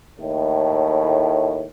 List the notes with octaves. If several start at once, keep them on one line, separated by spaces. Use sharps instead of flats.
D#2 A2